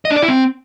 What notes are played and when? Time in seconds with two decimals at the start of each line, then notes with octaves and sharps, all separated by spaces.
0.05 D#5
0.11 D4
0.17 D5
0.22 E4
0.28 C4